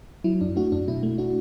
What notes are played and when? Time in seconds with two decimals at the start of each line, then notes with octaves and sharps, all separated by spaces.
0.24 F#3 E4
0.41 F#2 D4
0.56 A3 D4 F#4
0.72 F#2 D4
0.88 B2 E4
1.03 A3
1.18 D4 F#4